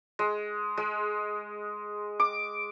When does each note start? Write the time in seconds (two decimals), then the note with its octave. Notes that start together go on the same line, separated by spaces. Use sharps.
0.19 G#3
0.77 G#3
2.20 D6